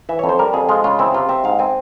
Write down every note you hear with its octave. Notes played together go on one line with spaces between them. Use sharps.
E3 E5
F2 C#5
C5
G3 A#4
F2 G#4
G#3 F4
C#3 F4
C4 E4
C3 F4
C4 E5
G#2 F5
C4 G#5